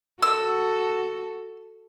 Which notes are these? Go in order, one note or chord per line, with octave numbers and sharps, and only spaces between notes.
F#4 A4 E6